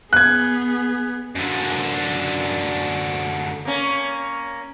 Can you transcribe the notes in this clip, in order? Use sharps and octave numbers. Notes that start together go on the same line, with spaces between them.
B3 G#4 F#6 G#6
F#2 D3
A#3 C#4